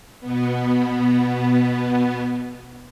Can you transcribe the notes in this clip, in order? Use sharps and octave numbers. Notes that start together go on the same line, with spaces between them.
B2 B3